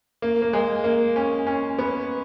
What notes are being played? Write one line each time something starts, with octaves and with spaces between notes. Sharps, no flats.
A#3
A#3
G#3
A#3
C#4
C#4
B3